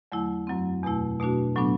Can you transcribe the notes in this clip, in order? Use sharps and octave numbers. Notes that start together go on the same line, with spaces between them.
E2 D3 F#3 A3 E4
F#2 F#3 C4
E2 B2 A3 E4
B2 A3 D4 F#4
A2 F#3 B3 D4